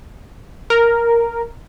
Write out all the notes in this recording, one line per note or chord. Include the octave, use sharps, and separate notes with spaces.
A#4